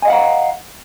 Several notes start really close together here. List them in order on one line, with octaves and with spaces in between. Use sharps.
G#5 D#5 F5 F#5 A#5